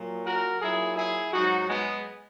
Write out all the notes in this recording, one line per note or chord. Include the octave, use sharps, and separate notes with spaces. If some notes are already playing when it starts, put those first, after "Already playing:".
Already playing: A#2 F#3
F#4 A#4
A#2 F#3 E4 G#4
E4 G#4
G#2 F#3 D#4 F#4
G#3 B3